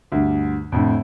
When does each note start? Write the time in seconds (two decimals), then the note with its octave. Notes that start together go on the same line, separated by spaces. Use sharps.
0.12 D2 G2
0.72 F2 A2 D3